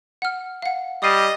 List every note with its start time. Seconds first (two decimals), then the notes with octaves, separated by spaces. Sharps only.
0.22 F#5 F6
0.62 F5 F#5
1.03 G3 D#5 D#6 C7 D#7